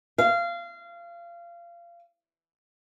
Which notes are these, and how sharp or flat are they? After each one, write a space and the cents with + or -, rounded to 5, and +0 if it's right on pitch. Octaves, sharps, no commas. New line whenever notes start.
F5 -25